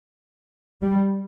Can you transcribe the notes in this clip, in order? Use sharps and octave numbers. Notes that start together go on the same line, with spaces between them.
G3